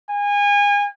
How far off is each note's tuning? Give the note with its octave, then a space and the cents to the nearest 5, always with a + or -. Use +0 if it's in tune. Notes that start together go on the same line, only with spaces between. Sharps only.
G#5 -30